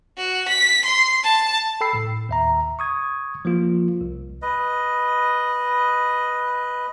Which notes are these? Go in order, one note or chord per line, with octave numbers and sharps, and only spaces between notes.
F#4
B6
C6
A5
A4 G5 B5 E6 C7
A2
D#2 E5 A#5
C#6 D#6 G#6
F3 A#3 F4
C2
B4 D#5